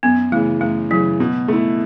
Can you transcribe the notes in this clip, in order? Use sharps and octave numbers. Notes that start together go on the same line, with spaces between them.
F#2 B3
C#3 E3 A3
F#2 A3
C#3 E3 F#3
B2
A3 E4